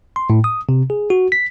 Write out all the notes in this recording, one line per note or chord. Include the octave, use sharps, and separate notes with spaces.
C6
A2
D#6
C3
G#4
F#4
B6